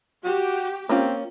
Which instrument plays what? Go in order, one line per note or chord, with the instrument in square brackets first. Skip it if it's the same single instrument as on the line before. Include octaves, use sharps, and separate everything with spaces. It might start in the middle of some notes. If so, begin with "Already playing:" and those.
[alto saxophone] F#4 [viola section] G4
[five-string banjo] A#3 C#4 F4 [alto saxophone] C4